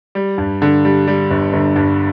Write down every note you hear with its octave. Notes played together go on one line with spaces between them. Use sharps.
G3
G2
D3
G3
G3
G1
G1
G2